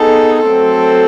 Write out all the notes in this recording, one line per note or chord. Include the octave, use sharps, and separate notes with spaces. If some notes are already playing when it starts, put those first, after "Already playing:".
Already playing: B3 D#4 G#4 A4
F#3 A3 C4 A4